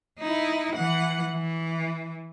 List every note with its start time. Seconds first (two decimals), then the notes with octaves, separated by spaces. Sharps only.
0.19 D#4 E4
0.75 E3 F#5
1.33 E3